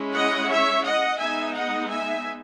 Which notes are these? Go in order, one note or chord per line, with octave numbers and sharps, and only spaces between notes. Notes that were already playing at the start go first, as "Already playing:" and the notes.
Already playing: G#3 C#4 E4
D#5 F#5
C#5 E5
D#5 F#5
G#3 B3 D#4 E5 G#5
D#5 F#5
E5 G#5